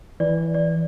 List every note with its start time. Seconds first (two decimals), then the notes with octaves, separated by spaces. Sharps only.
0.20 E3 D5
0.54 D5